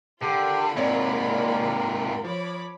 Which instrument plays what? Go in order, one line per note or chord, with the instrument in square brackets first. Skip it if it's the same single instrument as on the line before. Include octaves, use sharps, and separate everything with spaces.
[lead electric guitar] D3 [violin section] F4 A#4 B5 [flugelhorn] G4
[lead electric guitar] G#2 C3 [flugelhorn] A#3 [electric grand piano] C4 C#5 D5
[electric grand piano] F3 [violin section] C#5 B5 D6